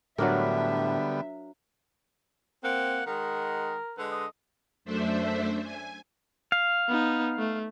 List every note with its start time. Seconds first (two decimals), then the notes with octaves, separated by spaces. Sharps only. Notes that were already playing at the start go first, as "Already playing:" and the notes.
0.18 A2 D3 F#3 G3 B3 D4 A#4 E5
2.64 A#3 C4 F#5
3.07 D#3 G#3 A#4 F#5
3.98 D3 G#3 B4
4.12 D#5
4.85 F#2 A3 D4 C5 E5
5.63 G#5
6.52 F5
6.88 B3 D#4
7.39 A3